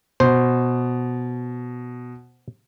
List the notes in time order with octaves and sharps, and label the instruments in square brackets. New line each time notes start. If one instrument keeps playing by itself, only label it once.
[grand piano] B2 [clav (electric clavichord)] C5